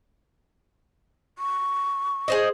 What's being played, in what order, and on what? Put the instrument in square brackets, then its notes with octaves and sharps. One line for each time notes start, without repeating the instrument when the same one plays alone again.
[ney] C#6
[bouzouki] G#4 C5 D#5